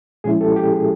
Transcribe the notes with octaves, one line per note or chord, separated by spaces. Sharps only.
A#2 F3 G#3 C#4 E4 G#4
G4 A4
G4
G#4